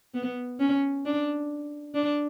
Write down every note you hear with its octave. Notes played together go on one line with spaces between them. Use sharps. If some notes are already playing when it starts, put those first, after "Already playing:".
B3
C#4
D4
D4